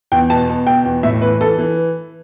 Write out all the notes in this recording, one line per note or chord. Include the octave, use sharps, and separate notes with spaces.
E2 G5
B2 A5
B2
B2 G5
E2
A2 E5
E3 B4
E3 A4
E3